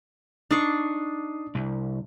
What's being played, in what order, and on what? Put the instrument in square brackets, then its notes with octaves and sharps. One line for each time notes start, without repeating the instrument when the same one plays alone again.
[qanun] D4 C#6 [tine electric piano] D#4 D#6 C7
[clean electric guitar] C2